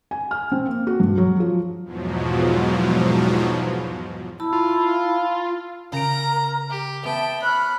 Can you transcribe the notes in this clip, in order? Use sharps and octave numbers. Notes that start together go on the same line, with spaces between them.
G#5
F6
C4
A#3
F#4
G2
F#3
F3
E2 G#2 B2 F3 F#3
E4 A5 B5 E6
F4
C#3 A#4 A#5 D7
G4
B3 E5 G5 A5
C#5 B5 F6 F#6